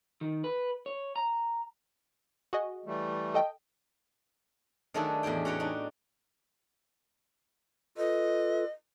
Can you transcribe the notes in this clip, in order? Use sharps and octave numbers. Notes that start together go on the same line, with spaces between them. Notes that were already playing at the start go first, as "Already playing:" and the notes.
D#3
B4
C#5
A#5
F#4 G#4 D#5
E3 G3 A3
A4 D#5 G5
D#3 F#3 A3 D4 G#4 A4
E2 A2 G4 G#4 G5
C#4 F#4 B4 C#5 G5
D4 D#4
F4 A4 B4 D#5